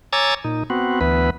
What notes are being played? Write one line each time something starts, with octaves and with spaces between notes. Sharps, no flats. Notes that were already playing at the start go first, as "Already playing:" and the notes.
C#5 G#5 A#5 D6 E6 A6
A#2 D#4
B3 C4 F#4
D2 E3 B3 B4